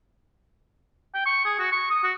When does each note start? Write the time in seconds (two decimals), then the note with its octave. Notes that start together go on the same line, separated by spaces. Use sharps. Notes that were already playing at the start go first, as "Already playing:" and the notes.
1.14 G5
1.26 C#6
1.45 G#4
1.59 F#4
1.72 C#6
1.90 D#6
2.04 F#4